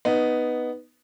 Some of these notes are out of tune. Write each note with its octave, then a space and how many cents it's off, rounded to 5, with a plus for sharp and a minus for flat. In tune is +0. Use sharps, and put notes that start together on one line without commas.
B3 +0 D#4 +0